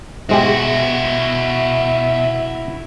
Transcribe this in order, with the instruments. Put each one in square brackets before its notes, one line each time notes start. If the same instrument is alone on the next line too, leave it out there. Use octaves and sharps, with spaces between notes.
[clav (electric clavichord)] G#2 G#3 G4 [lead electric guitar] B2 [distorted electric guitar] E4 F#4 [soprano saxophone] E5